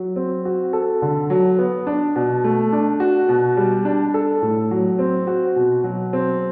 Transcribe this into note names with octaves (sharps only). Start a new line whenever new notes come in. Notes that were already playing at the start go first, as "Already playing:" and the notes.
Already playing: F#3
C4
F#4
A4
D3
F#3
B3
D4
B2
A3
D4
F#4
B2
G3
D4
A4
A2
F#3
C4
F#4
B2
F#3
C4